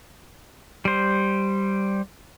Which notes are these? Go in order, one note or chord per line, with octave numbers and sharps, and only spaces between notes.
G3 C5